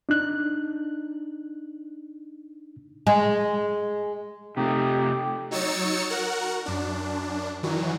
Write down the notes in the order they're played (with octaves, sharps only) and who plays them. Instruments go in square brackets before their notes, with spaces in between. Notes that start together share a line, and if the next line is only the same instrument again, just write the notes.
[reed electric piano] D4 D#4 F#6
[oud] G#3
[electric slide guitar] C3 A3 [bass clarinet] D#4 [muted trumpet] G4
[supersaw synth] F#3 D#4 C#5 E6 A6 C#7
F#4 A#4 F#5
F#2 D4
D#3 E3 F#3